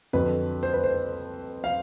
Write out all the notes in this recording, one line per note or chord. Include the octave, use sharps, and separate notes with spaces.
F2 D3 F#3 B4
C5
B4
C5
F5